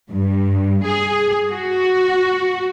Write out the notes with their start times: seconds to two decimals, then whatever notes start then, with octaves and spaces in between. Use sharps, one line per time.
0.12 G2
0.85 G#4
1.51 F#4